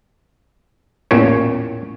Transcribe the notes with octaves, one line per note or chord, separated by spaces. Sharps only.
A1 E2 A#2 C#5